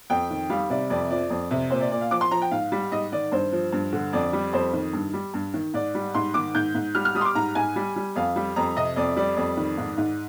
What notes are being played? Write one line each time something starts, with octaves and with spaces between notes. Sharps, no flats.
F2 G5
D#3
G3 F5
C3 D5
F2 D5
F3 D5
F2
C3
A#2 C5
D5
A#2 D5
F5
F3 D6
C6
F3 A#5
G5
G#2 F5
G3
G#2 D#5
D#3 D5
G2 C5
F3
G2
D3
F2 D5
G3
F2 C5
D#3
G2
G3
G2
D#3
G#2 D5
G3
G#2 C6
D#3 D6
G#2 G6
G#2
G3 F6
F6
G3 D#6
C6
D6
G#2 A#5
G#2 G#5
G3
G3
F2 F5
G3
F2 A#5
C3 D#5
F2 D5
G3 D5
F2
D#3
G#2
G#2